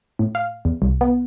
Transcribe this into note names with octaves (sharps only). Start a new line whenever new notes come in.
A2
F5
E2
C2
B3